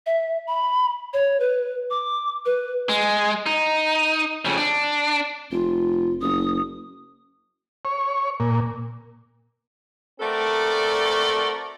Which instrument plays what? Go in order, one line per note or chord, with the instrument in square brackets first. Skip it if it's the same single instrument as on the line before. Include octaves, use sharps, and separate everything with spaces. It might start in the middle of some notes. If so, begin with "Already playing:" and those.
[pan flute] E5
B5
C#5
B4
D6
B4
[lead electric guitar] G#3
D#4
F2 C#3
D4
[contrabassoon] F1 [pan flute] F4
[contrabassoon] F#1 [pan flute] D#6
[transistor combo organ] C#5
A#2
[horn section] A3 C4 F#4 A4 A#4 D5